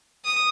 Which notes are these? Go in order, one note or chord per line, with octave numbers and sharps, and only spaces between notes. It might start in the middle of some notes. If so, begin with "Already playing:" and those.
D#6